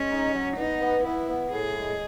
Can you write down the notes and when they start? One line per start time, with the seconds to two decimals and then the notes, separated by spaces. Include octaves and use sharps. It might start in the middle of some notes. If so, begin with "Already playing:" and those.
Already playing: G#3 C#4
0.10 D#4
0.33 F#3
0.57 B3 D#4
0.81 B3
1.05 B3 E4
1.29 B3
1.53 A2 G#4
1.76 G#3